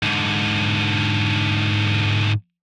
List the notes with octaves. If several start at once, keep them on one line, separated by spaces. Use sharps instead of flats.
G#2 D3